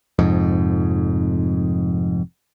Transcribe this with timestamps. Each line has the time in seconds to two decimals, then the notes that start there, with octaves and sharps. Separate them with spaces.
0.19 F1 F2 G#2